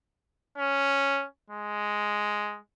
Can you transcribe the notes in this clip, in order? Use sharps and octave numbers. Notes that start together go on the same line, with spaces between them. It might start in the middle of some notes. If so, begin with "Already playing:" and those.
C#4
G#3